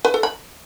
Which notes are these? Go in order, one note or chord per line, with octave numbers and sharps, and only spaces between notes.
B4
A4
B5